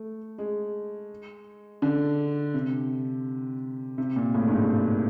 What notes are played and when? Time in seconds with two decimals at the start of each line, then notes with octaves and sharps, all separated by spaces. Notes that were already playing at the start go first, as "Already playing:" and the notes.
Already playing: A3
0.38 G#3
1.82 D3
2.54 C3
3.98 C3
4.16 A#2
4.35 A2
4.47 G2
4.52 G#2